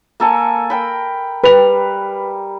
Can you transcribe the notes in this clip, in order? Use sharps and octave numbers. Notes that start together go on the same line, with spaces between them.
A#3 A4 G#5
A#4 G5 B5
G3 B4 F7